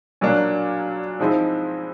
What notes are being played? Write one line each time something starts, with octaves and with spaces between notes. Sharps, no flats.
A#2 F#3 A#3 D4
G#2 F3 G#3 C4 E4